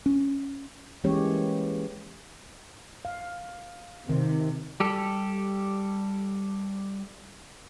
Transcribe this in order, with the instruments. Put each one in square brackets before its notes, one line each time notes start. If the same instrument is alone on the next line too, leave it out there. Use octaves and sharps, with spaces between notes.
[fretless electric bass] C#4
[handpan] E3 G#3 A#3 C#4 G4 C#5
F5
[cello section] C3 [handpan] D#3
[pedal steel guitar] G3 G4 A4